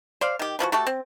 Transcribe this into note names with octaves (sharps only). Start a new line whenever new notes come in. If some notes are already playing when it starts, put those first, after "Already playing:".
C5 D5 F5
D#3 G4
E3 F3 A#3 F#4
A3 F#4 G4 A4
C4